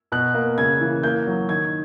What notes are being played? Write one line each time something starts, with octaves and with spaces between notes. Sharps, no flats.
B2 F#6
A#3
C#3 G#6
E3
A#3 G6
F#3
D#3 G#6